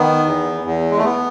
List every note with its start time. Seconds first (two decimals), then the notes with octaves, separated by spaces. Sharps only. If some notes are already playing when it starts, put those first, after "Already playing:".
Already playing: D#3 B3
0.25 E2
0.65 E2
0.91 G#3
0.98 A3
1.05 B3